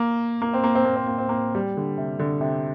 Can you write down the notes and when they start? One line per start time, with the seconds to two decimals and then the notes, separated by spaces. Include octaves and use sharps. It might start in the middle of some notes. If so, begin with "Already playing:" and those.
Already playing: A#3
0.42 A#3
0.53 C4
0.64 A#3
0.75 C4
0.85 A#3
0.96 C4
1.07 A#3
1.18 C4
1.29 A#3
1.55 G3
1.77 D3
1.98 C3
2.19 D3
2.41 C3